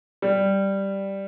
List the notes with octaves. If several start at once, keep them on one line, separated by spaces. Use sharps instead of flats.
G3